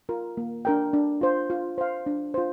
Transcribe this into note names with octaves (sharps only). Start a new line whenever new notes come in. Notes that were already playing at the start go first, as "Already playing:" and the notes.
F4 A#4
A#3
D4 A#4 G5
D4
F4 C5
F4
C5 F5
D4
F4 C5